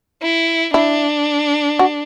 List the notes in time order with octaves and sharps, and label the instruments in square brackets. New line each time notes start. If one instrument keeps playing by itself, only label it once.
[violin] E4
[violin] D4 [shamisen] E4
[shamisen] F#4